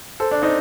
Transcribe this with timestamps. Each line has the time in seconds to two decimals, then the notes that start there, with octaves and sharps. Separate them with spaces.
0.20 A4 C5
0.31 D4
0.42 C4 D#4